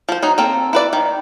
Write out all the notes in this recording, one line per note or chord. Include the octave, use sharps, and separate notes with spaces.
F3 C5
F#3 D#4
A#3 C4 A4
E4 B4 D5
D#3